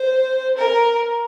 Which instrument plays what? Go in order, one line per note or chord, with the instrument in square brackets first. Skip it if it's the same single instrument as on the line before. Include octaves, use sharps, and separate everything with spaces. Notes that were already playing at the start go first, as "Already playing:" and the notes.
Already playing: [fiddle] C5
A#4